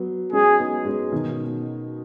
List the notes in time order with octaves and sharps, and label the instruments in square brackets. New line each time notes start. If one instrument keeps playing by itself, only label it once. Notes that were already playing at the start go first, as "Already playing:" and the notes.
Already playing: [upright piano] F#3 B3
[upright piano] G#3 C#4 [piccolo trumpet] G#4
[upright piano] B3 D#4
G#3 C#4
B2 D#3